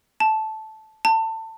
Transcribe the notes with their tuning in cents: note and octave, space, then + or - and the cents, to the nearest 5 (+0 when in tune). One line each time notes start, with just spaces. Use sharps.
A5 -10
A5 +25